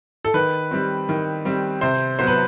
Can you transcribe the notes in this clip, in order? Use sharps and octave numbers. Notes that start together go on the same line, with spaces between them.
A4
D#3 B4
G3 C4
D#3
G3 C4
C3 C5
F#3 B3 C5
B4